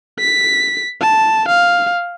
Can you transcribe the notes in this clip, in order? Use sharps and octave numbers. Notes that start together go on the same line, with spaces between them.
B6
A5
F5